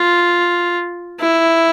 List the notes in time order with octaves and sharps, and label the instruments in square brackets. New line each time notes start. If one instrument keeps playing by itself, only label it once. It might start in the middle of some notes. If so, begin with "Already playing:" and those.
Already playing: [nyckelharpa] F4
E4